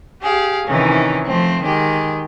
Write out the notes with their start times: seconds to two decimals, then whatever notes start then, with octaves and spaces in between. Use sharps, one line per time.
0.22 G4 G#4 F5
0.67 C3 D#3 E3 C#4 D#4
1.25 F3 A3 C4
1.62 D#3 G#3 G4